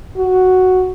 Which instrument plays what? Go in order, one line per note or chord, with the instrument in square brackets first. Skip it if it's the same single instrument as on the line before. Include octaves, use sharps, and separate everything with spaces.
[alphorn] F#4